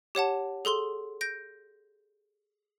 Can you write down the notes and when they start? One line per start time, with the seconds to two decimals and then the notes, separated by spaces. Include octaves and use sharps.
0.15 G4 C#5 F#5 A5
0.65 G#4 A4 C6 G7
1.21 G6 A#6 D7